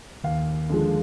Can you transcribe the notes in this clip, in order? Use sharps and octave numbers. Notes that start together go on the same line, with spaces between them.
D#2 F5
D3 F3 G#3